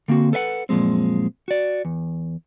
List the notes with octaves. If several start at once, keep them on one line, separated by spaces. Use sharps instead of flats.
D3 A#3 C4 F#4
A4 B4 E5 F#5
F#2 A#2 F3 G#3 C4
F#4 D5
E2